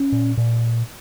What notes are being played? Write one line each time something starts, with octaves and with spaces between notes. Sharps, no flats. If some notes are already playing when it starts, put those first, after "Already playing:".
Already playing: C#4
A#2
A#2